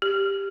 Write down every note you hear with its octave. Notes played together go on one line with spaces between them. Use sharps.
G4